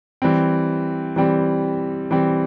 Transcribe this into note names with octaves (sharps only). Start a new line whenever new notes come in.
E3 G3 C4
E3 G3 C4
E3 G3 C4